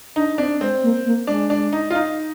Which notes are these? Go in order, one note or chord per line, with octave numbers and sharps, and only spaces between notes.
D4 D#4
C4 D4
G#3 C4
A#3
A#3
G#3 D4
D4
D#4
F4
D#4